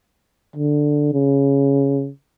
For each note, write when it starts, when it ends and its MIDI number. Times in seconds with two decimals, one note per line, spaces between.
0.56 1.09 50
1.13 2.09 49